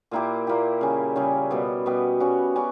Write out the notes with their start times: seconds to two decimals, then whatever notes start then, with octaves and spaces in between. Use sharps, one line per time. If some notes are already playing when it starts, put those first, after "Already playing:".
0.11 A#2 A#3 E4 G4
0.47 A#2 A#3 E4 G4
0.81 C#3 G3 C#4
1.16 C#3 G3 C#4
1.51 B2 G3 B3
1.86 B2 G3 B3
2.20 G3 C#4 F#4
2.56 G3 C#4 F#4